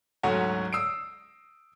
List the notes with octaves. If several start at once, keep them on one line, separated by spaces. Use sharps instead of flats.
D2 G#2 F#3 A3 C#4 F#4
D#6 E6 C7 D7